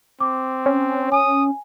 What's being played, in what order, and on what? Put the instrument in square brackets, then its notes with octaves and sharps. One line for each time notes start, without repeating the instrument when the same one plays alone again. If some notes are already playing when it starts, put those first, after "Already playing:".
[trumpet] C4 [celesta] D6
[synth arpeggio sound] C#4
[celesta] G#5 [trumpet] D#6